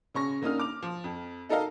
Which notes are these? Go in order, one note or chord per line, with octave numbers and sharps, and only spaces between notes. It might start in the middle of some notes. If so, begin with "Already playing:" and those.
C#3 C#4 C#6 A#6
D3 A#3 C#4 D#4 D#6 F6
D6 F7
F3
F2
D#4 A4 A#4 D#5 F5 A5